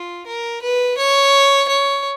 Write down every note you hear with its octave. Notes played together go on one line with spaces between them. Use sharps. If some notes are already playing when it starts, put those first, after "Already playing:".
Already playing: F4
A#4
B4
C#5
C#5